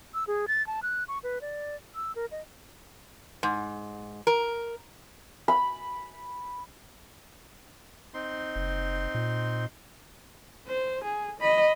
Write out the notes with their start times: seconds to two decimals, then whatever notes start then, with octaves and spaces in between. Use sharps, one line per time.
0.14 E6
0.27 G#4
0.48 A6
0.67 A5
0.83 F#6
1.08 C#6
1.23 B4
1.41 D5
1.95 E6
2.16 A#4
2.31 D#5
3.43 G#2
4.27 A#4
5.48 B5
8.14 C4 D#4 C6
8.56 F#1
9.15 A#2
10.68 C5
11.04 G#4
11.41 D#5 B5